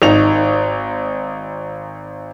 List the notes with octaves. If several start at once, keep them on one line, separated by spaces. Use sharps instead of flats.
G#1 D#4 F7